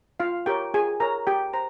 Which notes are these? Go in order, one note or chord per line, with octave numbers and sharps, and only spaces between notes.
F4 F5
G4 A#4 C#5 G5
F4 G#4 G#5
A#4 C#5 A#5
G4 G5
C5 A#5